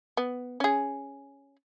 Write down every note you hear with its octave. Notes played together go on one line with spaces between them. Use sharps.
B3
C#4 G#4